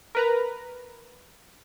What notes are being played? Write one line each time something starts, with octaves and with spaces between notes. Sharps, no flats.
A#4 B4 A#5